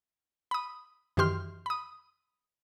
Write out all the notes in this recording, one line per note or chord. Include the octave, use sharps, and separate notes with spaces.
B5 D#6
F#2 D#3 E3 G4 C6 F6
B5 D#6